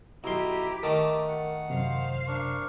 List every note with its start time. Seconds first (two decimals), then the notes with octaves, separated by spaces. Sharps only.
0.24 B1 E4 G4 A#5 C6
0.83 D#3 A3 A#4 A5 D6
1.28 F#5
1.70 F#2 C3 C5 F5
2.27 D4 A#4 C#6